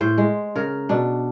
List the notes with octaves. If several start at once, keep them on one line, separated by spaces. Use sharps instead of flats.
A2 C5
G#3
C#3 A#4
B2 D4